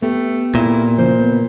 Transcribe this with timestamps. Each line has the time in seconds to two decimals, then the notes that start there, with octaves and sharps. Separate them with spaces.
0.02 A3 B3 G4
0.55 A#2 E4
0.98 C#3 E3 F3 C5
1.20 B3